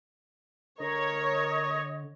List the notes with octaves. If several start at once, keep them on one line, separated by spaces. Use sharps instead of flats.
D3 A#4 C#5 D#5